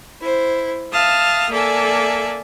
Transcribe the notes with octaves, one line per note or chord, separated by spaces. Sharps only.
E4 C5
E5 F5 A5 D#6 F6
A#3 A4 D5 E5 G#5